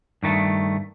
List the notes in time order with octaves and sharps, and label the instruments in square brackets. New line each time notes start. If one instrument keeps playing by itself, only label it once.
[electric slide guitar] G2 D#3 A3